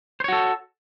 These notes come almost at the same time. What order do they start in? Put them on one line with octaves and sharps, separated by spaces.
C5 C#5 F#4 A4